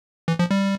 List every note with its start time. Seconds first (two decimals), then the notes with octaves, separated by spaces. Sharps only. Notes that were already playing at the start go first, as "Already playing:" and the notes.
0.28 E3
0.39 F3
0.51 G3